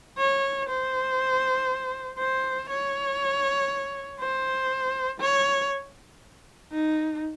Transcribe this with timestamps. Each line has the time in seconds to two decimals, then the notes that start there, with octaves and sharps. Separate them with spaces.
0.18 C#5
0.68 C5
2.18 C5
2.69 C#5
4.20 C5
5.20 C#5
6.72 D#4